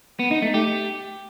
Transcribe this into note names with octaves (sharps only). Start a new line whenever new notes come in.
B3
D#4
A3
G4